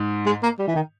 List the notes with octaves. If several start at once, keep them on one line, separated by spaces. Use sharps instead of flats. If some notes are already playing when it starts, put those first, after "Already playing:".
Already playing: G#2
G#3
A#3
G3
E3
D#3